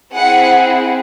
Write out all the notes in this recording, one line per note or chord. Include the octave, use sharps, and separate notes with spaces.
C4 E4 G#4 F#5